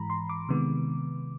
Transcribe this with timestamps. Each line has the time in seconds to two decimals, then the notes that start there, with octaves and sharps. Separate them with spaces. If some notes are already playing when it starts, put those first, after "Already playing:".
Already playing: G#2 E3 G#3 A#5 B5
0.10 C6
0.29 D6
0.49 C3 D#3 G#3 B3